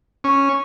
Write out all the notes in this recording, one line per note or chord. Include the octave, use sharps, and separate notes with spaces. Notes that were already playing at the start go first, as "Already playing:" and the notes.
C#4